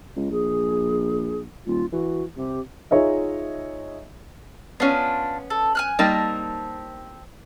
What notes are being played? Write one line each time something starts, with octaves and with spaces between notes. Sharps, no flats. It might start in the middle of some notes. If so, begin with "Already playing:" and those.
C#2
A#1 G#4
D#1 F4
E3 F#4
C3 G4
D#4 F4 G#4 C#5 D#5 E5
B3 C#4 D4 F4
A4
G#5 F6 F#6
G3 A#3 C4 D#4 A5